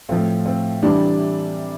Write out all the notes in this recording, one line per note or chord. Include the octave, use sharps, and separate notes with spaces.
A2 F3 C4
C4
C3 E3 G3 D4